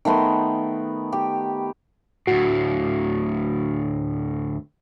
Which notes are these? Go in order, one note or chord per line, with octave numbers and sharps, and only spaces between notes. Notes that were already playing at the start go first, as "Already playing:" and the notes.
D#3 A3 B3 C6
G4
D2 A2 F#4